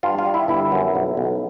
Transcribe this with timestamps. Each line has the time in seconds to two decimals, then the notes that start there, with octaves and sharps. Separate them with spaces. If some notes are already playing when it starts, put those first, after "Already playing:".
0.03 G2 F4
0.19 F4
0.26 G3
0.34 E4
0.48 G1 E4
0.72 F#2
0.95 B1
1.17 B1